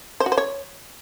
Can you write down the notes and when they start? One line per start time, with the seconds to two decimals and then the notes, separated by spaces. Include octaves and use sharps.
0.20 C5
0.26 F#4
0.32 C5
0.37 C#5